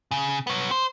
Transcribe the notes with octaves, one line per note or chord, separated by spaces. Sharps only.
C#3
B3 C#5
C5